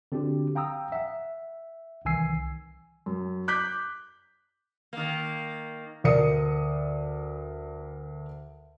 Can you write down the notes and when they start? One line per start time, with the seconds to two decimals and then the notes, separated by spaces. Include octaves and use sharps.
0.12 D3 C4 D4 F#4 G4
0.55 F5 G5 A#5 D#6 E6
0.92 E5 F#5
2.05 C2 D#3 E3 G#5 E6 C7
3.06 F#2
3.48 D6 F#6 G6 B6
4.93 D#3 A#3
6.04 D2 A#4 D5 D#6 C#7